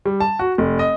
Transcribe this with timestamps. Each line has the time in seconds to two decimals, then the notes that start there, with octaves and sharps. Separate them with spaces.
0.05 G3
0.20 A5
0.39 F#4
0.58 F1
0.79 D#5